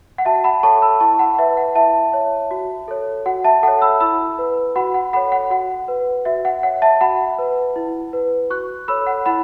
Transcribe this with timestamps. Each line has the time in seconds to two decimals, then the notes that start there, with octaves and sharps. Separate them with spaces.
0.18 F#5
0.25 F#4 E5 A5
0.44 F#5 B5
0.63 A4 C#5 A5 C#6
0.82 B5 E6
1.00 E4 A5 C#6
1.19 F#5 B5
1.38 B4 E5
1.57 F#5
1.75 E4 E5 A5
2.13 C#5
2.51 F#4
2.88 A4 C#5
3.26 F#4 F#5
3.44 E5 A5
3.63 A4 C#5 F#5
3.82 B5 E6
4.00 E4 B5 E6
4.38 B4
4.76 F#4 F#5 B5
4.94 F#5
5.13 A4 C#5 F#5 B5
5.32 F#5
5.50 F#4 F#5
5.88 B4
6.25 F#4 E5
6.45 F#5
6.63 C#5 F#5
6.82 E5 A5
7.01 F#4 F#5 B5
7.38 B4
7.76 E4
8.13 B4
8.50 F#4 C#6 F#6
8.88 A4 C#5 B5 E6
9.07 F#5 B5
9.26 E4 F#5 B5